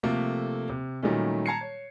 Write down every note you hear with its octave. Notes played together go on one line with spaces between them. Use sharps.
C3 F3 A3 A#3 A4
C3
A#2 D#3 F#3 G3 A3 C#4
A5 A#5 G#6 C7 C#7
C#5